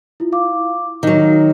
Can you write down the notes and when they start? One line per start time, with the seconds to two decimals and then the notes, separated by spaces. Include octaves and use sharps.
0.20 E4 F4
0.32 F5 D6
1.03 D#3 F#3 D#4 D#5